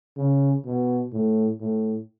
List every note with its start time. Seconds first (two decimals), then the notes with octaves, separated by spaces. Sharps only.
0.17 C#3
0.65 B2
1.12 A2
1.60 A2